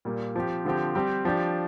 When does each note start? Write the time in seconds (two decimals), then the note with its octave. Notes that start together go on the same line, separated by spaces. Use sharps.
0.05 A#2 G3 A#3
0.36 F3 C4 G4
0.65 D3 F3 C4 G4
0.95 G3 C4 G4
1.25 F3 D4 G4